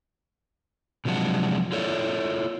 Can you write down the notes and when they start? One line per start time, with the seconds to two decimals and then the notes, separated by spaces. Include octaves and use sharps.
1.05 C3 F3 F#3 G#3 D4 F#5
1.72 E4 F4 A4 C#5 D5